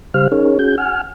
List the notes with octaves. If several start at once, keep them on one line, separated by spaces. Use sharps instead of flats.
C#3 G3 G4 C5 F5 F6
C#4 D#4 G#4 A#4 C#5
C#4 F#4 G#4 G6
F#5 G#5 F6